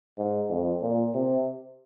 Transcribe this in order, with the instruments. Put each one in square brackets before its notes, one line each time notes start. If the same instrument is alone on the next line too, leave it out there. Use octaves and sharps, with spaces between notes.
[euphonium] G#2
F2
A#2
C3